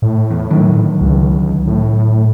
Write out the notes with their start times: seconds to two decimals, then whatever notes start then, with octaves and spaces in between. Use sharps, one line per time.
0.02 A2
0.30 E2
0.51 D3 D#3 F#3
1.01 C#2
1.67 A2